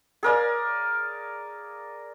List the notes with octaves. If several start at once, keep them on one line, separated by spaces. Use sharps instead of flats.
G#4 A#4 D5 F5